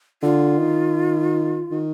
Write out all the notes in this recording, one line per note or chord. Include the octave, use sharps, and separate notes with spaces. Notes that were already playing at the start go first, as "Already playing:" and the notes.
D3 F4
D#3
D#3